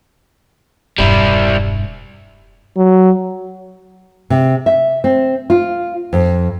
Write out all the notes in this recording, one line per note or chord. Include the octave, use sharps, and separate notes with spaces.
E1 G2 G3 E4
F#3
C3
E5
C4
F4
F2